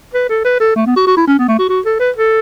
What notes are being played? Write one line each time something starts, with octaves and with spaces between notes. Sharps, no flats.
B4
A4
B4
A4
A3
B3
F#4
F#4
E4
C#4
B3
A3
F#4
F#4
A4
B4
A4